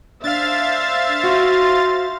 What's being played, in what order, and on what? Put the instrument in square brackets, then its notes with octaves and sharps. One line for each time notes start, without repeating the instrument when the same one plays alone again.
[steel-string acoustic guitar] D4 [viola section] C5 E5 [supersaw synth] F5 A6
[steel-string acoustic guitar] F#4 [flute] C6